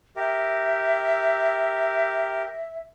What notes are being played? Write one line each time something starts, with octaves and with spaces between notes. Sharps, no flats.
G4 A#4 E5